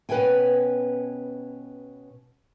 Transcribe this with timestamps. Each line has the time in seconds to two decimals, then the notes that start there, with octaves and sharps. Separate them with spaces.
0.09 B2 C#4 B4 C#5 G5 G#5